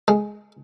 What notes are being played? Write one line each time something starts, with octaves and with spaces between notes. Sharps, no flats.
G#3